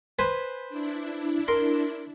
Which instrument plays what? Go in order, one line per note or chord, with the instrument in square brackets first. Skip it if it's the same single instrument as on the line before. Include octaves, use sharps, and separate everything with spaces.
[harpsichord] B4 C5 G#5
[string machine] D4 E4
[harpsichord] A#4 C6